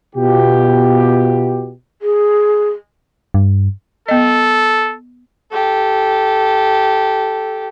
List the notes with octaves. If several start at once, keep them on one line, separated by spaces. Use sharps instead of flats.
B2 F4 G4
G#4
G2
B3 A4 D#5
G4 A4